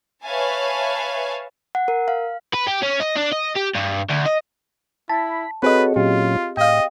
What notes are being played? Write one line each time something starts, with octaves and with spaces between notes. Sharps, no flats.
B4 C#5 E5 F5 G#5 A5
F#5
A#4
F5
B4
G4
C#4
D#5
D4
D#5
G4
G2
D2
D#5
E4 A5 B5
C4 F#4 G#4 A4 B4 C#5 D#5
A#2 F#3 C#4 F4 G4
A2 D#5 F5 G5